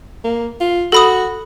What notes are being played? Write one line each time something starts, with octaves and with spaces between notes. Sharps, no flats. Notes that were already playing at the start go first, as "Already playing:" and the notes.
A#3
F4
F#4 A4 B5 D#6